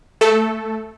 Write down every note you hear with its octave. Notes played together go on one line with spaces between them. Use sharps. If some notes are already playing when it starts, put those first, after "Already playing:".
A3 A4